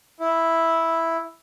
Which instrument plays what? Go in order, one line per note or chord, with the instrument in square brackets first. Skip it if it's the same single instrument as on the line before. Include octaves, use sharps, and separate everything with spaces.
[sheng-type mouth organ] E4